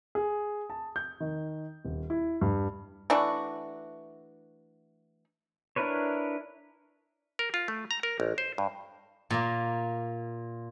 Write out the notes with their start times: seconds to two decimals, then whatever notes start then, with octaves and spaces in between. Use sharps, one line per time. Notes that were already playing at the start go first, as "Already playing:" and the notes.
0.15 G#4
0.70 A5
0.96 G6
1.20 D#3
1.85 D#1
2.10 E4
2.41 G2
3.10 E3 A3 D4 F#4
5.76 D4 E4 A#4 B4 C#5
7.39 A#4
7.54 F4
7.68 A3
7.91 A#5
8.03 A#4
8.20 A1
8.38 C5
8.58 G2
9.30 A#2 A#3